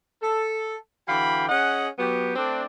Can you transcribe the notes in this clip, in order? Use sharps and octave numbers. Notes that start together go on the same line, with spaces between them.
A4
D3 E3 F#4 F5 G5 B5
C#4 G#4 D#5 F#5
F#3 B3 G4
A3 C4 D4